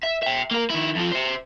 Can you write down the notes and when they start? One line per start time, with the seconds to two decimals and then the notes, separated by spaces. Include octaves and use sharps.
0.03 E5
0.23 E5 G5
0.51 A#3 A#4
0.70 D#3 E4
0.96 F2 F3
1.12 C5 E5